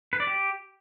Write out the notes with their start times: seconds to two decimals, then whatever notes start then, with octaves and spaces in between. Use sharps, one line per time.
0.13 B4
0.20 D5
0.27 G4